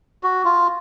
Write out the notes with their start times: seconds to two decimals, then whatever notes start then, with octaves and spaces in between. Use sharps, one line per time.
0.23 F#4
0.45 F4